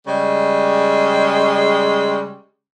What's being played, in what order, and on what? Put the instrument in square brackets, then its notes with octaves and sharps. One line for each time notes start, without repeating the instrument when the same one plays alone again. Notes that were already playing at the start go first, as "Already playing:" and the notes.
[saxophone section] C#3 G3 G#3